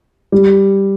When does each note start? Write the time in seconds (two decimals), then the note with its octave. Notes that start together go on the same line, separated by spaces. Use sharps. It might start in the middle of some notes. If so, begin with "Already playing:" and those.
0.32 G3